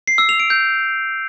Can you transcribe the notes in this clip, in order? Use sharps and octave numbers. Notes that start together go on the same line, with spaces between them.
C7
E6
F7
D7
G6